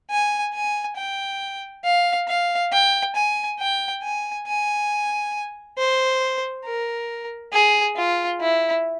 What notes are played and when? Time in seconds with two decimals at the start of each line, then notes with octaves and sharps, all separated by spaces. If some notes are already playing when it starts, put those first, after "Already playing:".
0.11 G#5
0.54 G#5
0.97 G5
1.84 F5
2.28 F5
2.73 G5
3.15 G#5
3.60 G5
4.03 G#5
4.47 G#5
5.79 C5
6.65 A#4
7.53 G#4
7.96 F4
8.41 E4